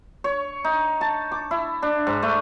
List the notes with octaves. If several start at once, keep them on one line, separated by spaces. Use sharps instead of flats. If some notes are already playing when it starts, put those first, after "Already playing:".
C#5
D#4
A5
D6
E4
D4
G#2
A3